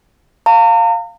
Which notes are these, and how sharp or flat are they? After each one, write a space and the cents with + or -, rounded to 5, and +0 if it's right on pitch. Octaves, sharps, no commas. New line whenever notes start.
F5 +5 A#5 -40